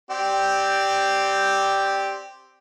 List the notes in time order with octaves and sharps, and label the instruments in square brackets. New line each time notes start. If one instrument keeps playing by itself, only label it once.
[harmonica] C4 G4 D5